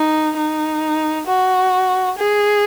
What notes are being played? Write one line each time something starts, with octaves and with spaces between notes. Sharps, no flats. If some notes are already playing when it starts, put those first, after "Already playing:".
Already playing: D#4
D#4
F#4
G#4